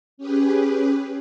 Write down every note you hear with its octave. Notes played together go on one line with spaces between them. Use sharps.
C#4 G4 G#4 B4